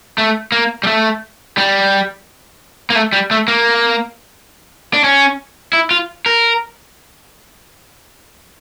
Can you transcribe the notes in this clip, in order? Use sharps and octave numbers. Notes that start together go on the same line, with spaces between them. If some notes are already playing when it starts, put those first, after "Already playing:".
A3
A#3
G3
A3
G3
A#3
A3
G3
A3
A#3
D4
C#4
E4
F4
A#4